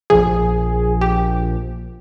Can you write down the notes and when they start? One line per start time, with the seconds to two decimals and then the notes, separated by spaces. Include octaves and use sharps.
0.10 A#1 A#2 F3 G#4
1.01 G4